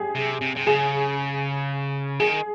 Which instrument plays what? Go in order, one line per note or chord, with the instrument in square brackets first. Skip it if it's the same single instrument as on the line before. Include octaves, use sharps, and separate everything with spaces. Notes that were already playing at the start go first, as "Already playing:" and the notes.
Already playing: [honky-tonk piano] G4 G#4
[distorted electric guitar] C3
C3
C3
[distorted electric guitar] C#3 [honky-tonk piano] G#4
[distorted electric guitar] D#3 [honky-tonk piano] G#4